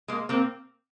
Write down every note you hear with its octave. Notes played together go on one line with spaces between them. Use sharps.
G#3 A#3
A#3 C4